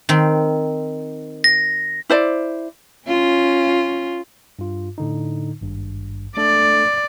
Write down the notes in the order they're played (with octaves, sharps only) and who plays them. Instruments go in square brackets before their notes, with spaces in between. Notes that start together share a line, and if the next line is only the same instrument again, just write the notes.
[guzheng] D#3 C4
[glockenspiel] A#6
[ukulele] E4 C5 D5
[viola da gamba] C#4 F4
[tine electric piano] G2 F4
A2 D3 D#4
G#1 G2
[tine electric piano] A3 D4 A4 [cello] D5